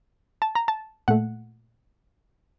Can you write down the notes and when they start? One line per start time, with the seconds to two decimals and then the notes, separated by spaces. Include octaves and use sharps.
0.42 A5
0.55 A#5
0.68 A5
1.08 A#2 A3 F#5